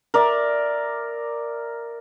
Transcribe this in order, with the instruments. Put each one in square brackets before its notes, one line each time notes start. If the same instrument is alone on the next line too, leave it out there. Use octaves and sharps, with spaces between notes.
[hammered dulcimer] A#4 D5 E5